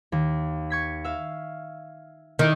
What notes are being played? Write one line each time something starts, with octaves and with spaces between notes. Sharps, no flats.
D#2
C#6 G#6 B6
E5 F5
D#3 E4 D5 E5